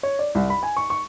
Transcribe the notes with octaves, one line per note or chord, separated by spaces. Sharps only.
C#5
D5
C2
B5
G#5
C#6
C#6